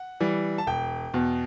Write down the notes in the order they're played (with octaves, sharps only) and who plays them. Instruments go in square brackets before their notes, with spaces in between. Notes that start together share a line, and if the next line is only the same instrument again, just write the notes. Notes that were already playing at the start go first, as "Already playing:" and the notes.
Already playing: [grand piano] F#5
E3 G3
A5
E1 G5
E2 B2